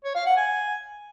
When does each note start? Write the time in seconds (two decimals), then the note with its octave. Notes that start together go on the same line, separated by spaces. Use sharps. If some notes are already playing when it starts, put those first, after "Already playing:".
0.04 C#5
0.15 F5
0.26 F#5
0.37 G#5